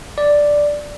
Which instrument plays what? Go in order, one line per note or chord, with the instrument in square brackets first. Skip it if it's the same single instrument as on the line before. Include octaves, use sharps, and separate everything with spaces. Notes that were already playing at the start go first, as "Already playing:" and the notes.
[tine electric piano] D5